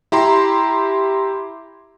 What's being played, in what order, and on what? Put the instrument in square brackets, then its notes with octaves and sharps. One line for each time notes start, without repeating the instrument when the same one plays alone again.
[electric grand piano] E4 G4 A#5 C6